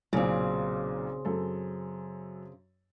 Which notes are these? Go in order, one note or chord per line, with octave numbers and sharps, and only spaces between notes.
B1 A#2 C#3 C4
F#2 A4